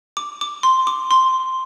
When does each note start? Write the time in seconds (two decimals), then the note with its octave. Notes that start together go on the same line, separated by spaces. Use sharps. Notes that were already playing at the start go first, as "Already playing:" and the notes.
0.17 D6
0.41 D6
0.63 C6
0.87 D6
1.11 C6